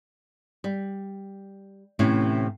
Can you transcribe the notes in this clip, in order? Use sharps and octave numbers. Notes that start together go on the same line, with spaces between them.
G3
A2 C3 E3 C#4